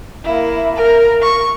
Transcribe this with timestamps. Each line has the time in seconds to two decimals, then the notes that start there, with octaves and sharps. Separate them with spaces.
0.24 A#3 E4
0.76 A#4
1.22 C#6